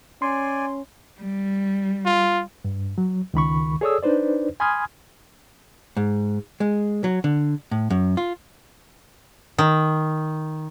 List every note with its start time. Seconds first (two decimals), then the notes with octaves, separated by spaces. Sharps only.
0.22 C#4 D5 G#5 C6
1.21 G3
2.05 F4
2.65 G2
2.98 F#3
3.34 C#2 D#3 B5 C#6
3.81 G#4 A4 C#5 D5 D#6 E6
4.03 D4 D#4 B4 C5 D5
4.60 G#5 B5 C6 D#6 F6 G#6
5.97 G#2
6.60 G#3
7.04 F#3
7.24 D3
7.71 A2
7.90 F#2
8.17 F4
9.58 D#3